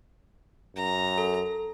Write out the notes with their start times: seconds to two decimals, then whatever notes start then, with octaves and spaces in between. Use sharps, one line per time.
0.76 F#2 A#5
1.18 A4